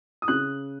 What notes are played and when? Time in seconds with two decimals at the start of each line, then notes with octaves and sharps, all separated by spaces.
0.22 D#6
0.28 C#3 F#6